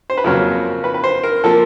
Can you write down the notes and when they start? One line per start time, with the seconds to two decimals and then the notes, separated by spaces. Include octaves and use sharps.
0.10 C5
0.17 B4
0.24 F2 C#3 F#3 A#3 A#4
0.84 B4
0.94 B4
1.04 C5
1.23 A#4
1.44 F3 A#3 A4